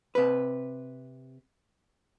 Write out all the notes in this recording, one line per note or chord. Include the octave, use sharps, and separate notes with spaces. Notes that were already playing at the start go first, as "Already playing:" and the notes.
C3 B4